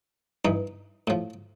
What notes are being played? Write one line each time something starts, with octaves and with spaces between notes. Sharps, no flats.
G2 E3 D#4
A2 F3